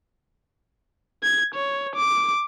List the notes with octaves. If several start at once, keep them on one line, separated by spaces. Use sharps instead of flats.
G#6
C#5
D6